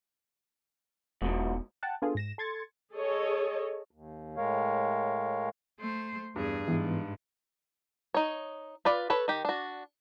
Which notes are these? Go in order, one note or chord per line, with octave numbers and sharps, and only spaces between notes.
E1 G#2 B2
F#5 G5 A5 F#6
B3 D4 F4 G#4 A4
G#2 A#6 E7
A4 C6 G#6 A6 C#7
G#4 A4 C#5 D#5
D#2
A2 G#3 A#4 C#5 F5
A3 C5
E2 G2 G#4
G#2 E3 B3
D#4 C#5
F4 B4 D5
A4 B4 C#5
D#3 G4
D4 F#4